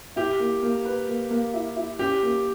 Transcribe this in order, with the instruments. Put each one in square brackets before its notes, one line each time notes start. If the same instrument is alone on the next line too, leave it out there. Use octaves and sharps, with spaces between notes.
[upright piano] E4 [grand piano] G4
[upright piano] A#3
A#3
B4
A#3
A#3
E4
E4
[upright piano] C#4 [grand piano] G4
[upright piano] A#3